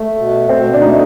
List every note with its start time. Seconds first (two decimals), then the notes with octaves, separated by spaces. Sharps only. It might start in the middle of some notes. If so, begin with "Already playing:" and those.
Already playing: A3
0.16 B2
0.49 B2 C4
0.74 D4
0.81 A3 D#4